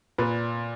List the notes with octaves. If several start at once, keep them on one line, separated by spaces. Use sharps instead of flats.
A#2 B4